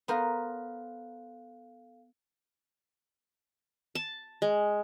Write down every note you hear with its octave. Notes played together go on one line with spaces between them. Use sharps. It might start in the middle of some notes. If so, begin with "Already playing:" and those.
B3 A4 A#4 C5 F5
A5
G#3